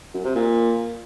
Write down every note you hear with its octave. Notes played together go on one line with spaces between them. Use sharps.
F#2
C3
A#2